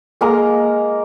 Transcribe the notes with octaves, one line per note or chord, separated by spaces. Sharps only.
G#3 A#3 A#4 A#5